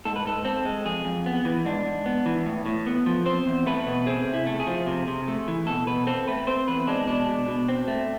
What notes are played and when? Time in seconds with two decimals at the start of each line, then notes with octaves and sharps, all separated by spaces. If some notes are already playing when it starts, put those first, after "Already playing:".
0.05 G#2 A4
0.16 B4
0.25 G#2 A4
0.45 C4 A4
0.65 G#3
0.85 F2 G#4
1.05 F2
1.26 B3
1.45 E3
1.65 G#2 D4
1.85 G#2
2.06 B3
2.26 E3
2.46 A2
2.66 A2
2.86 B3
3.06 F3
3.26 C4 C5
3.47 E2
3.66 A3 B4
3.87 B2
4.06 C4 G#4
4.27 C3
4.34 E4
4.46 A3
4.60 G#4
4.67 F3
4.86 C3
5.08 C3
5.28 A3
5.48 E3
5.67 B2 A4
5.87 B2 B4
6.07 C4 A4
6.28 A3 B4
6.47 C4 C5
6.68 E2 B4
6.87 G#3 D4
7.07 B2 D4
7.28 B2
7.48 B2
7.69 C4
7.88 A3